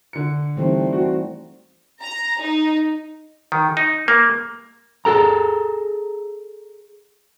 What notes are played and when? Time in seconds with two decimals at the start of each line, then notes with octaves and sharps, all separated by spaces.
0.13 D3 C#7
0.57 E3 G3 A3 C4 D#4
0.93 F#4
2.02 A#5
2.42 D#4
3.52 D#3
3.77 D#4
4.08 A#3
5.05 G#4 A4 A#5